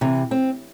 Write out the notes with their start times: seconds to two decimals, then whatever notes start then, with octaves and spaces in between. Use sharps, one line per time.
0.01 C3 E3
0.31 C4